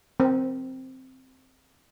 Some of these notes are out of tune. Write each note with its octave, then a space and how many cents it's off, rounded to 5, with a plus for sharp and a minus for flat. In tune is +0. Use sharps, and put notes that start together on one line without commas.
C4 +0 A#4 +20